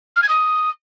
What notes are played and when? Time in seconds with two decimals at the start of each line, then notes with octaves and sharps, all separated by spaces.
0.16 F6
0.22 G#6
0.29 D#6